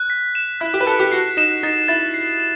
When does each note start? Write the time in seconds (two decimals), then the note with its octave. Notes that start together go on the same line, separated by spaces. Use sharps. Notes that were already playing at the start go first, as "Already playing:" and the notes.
Already playing: F#6
0.10 B6
0.35 E7
0.61 E4 F#6
0.74 G4
0.81 B4
0.87 A4 F#6
1.00 G4
1.12 F#4 C7
1.37 D#4 E7
1.63 D#4 A6
1.88 E4 A6
2.14 C7
2.40 E7